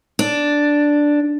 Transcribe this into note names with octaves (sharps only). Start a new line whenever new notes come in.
D4